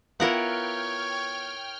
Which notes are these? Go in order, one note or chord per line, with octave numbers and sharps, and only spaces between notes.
B3 E4 F4 A#4 C#5 F#5 G5 F6